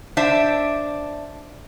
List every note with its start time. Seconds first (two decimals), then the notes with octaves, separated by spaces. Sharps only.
0.17 D4 C5 E5